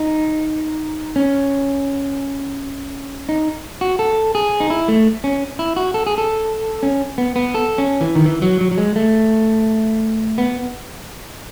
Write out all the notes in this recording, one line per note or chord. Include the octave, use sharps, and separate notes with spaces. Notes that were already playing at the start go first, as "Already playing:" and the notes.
Already playing: D#4
C#4
D#4
F#4
A4
G#4
D#4
E4
A3
C#4
E4
F#4
A4
G#4
A4
C#4
B3
B3
A4
C#4
E3
D#3
E3
F#3
F#3
F#3
G#3
A3
B3